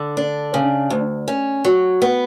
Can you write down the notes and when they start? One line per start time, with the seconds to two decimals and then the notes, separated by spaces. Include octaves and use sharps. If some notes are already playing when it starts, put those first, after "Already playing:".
Already playing: D3
0.17 D4
0.54 C#3
0.90 D2
1.28 C#4
1.65 F#3
2.02 B3